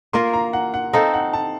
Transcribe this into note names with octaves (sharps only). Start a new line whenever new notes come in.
A#3 F4 A#4 C6
A#5
F#5
F#5
C4 D#4 A4 F5
F#5
A5